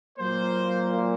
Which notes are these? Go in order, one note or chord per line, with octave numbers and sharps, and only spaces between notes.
A#2 F#3 A#3 C5